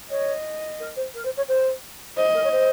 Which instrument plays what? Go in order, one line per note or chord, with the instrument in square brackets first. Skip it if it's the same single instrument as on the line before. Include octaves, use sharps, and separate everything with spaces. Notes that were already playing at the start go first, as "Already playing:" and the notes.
[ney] C#5 [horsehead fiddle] D#5
[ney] A#4
C5
A#4
C5
C#5
C5
[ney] C5 [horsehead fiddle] D#5
[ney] A#4
C#5
C5